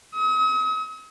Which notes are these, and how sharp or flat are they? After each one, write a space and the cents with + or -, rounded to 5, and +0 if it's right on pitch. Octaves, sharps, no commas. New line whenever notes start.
D#6 +45